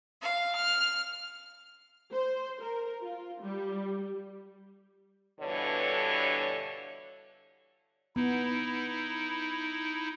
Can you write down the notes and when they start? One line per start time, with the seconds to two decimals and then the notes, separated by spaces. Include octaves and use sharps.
0.20 F5
0.54 F6
2.12 C5
2.61 A#4
3.02 F4
3.42 G3
5.41 G2 B2 D3 E3 A4 C#5
8.16 B3 D#4 E4